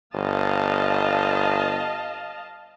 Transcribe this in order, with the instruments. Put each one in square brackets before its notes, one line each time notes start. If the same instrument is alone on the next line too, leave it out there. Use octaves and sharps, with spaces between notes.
[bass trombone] G1 [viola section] D#5 F5 A5